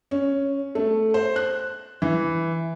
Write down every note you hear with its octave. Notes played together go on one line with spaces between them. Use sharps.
C#4
A3
C5
F#6
E3